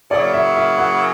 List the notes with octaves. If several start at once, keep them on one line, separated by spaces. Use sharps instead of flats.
C#3 F#3 A#3 E4 D5
E5
E5
F#5